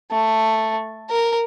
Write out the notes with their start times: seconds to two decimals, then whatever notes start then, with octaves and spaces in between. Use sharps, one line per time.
0.11 A3
1.10 A#4